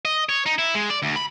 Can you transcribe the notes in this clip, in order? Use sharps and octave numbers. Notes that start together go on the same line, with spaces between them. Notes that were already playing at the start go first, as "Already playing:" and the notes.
D#5
C#5
D#4
E4
G#3
D5
D2
B5